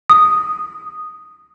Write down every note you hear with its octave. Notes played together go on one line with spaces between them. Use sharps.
D#6